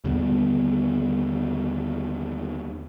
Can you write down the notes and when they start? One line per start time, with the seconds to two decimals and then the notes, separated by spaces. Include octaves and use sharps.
0.04 D#2 D3 G3 B3